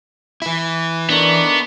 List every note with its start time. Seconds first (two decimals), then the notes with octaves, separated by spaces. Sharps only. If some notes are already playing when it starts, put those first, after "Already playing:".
0.42 E3 E4
1.10 D#3 A3 B3 D4